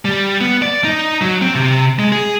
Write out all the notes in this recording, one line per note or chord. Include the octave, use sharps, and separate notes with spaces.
G3
B3
D5
D#4
F#3
C4
C3
G#3
G#4